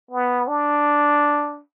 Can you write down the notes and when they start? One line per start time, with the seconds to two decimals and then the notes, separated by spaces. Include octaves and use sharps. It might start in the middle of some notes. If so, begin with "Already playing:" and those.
0.11 B3
0.48 D4